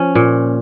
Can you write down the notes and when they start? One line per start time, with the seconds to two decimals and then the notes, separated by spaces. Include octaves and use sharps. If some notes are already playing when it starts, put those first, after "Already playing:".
Already playing: F3 C#4
0.15 A#2